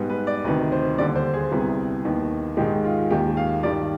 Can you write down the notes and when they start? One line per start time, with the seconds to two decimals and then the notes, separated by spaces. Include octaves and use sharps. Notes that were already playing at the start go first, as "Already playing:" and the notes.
Already playing: G#2 G3 B3
0.10 B4
0.27 D5
0.44 D2 C3 D#3 B4
0.72 C5
0.98 D#2 D3 G3 D5
1.16 C5
1.34 G#4
1.52 C2 C3 G3 B3
2.05 D#2 D#3 B3
2.57 G#2 D#3 G#3 G4
2.85 F4
3.10 D#2 D#3 G#3 G4
3.37 F5
3.63 G2 D#3 G3 D5